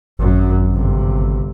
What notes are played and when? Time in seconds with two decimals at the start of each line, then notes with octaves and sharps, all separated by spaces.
0.19 G#1 F#2
0.71 G1 C3